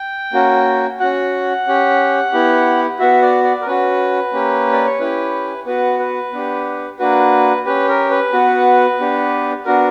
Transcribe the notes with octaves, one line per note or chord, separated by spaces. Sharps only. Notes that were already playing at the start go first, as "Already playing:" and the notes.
Already playing: G5
A#3 C#4 F#4
C#4 F#4 F#5
C#4 G4
B3 E4 G4
B3 F#4 E5
D5
D5
A#4
C#4 F#4 B4
A#3 C#4 G4
D5
C#5
C#4 E4 G4 B4
B3 F#4 B4
B4
B3 D4 G4
A#3 D4 F#4 B4
C#4 G4 B4
A#4
B4
B3 F#4
B3 D4 G4
B3 D4 F#4 A#4